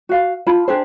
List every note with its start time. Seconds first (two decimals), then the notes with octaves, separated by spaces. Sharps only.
0.09 F#4 F5
0.46 F4 A5 B5
0.68 D4 G4 G#4 C5